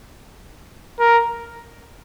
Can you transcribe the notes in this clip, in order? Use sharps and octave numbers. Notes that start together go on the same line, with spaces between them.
A#4